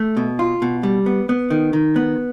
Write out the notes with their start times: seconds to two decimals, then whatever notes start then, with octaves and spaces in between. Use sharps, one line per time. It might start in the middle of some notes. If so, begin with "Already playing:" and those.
Already playing: A3
0.17 B2
0.39 F4
0.62 B2
0.83 G3
1.06 B3
1.29 B3
1.50 D#3
1.73 D#3
1.96 B3